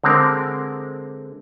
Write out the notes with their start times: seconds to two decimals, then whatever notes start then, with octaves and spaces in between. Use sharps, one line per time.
0.04 D3 G#3 C4 A#4